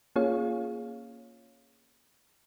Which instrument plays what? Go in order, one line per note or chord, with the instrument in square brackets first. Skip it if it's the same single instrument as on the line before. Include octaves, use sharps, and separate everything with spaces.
[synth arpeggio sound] A#3 C#4 F4 G#4 C#5 F5